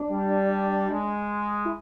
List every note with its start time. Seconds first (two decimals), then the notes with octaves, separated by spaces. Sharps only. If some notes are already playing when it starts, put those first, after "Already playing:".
Already playing: D4
0.11 G3
0.90 G#3
1.65 E4